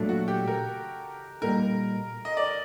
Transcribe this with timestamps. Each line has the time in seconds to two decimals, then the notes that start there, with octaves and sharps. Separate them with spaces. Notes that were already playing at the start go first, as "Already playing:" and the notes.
Already playing: A#2 F#3 A3 D4 A4
0.09 F#4
0.28 G4
0.47 A#4
1.42 A#2 G3 A#3 D#4 A#4
2.25 D#5
2.37 D5